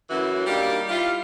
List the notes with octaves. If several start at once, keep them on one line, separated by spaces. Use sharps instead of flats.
F#2 A2 E3 E4 F#4
G3 A#3 D4 D#4 G4
G3 E4 F4